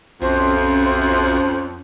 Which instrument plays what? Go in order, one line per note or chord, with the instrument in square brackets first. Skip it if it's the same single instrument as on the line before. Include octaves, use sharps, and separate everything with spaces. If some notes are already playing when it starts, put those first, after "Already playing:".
[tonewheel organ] B1 F#4 E5 [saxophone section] F2 [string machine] C#4 [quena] C5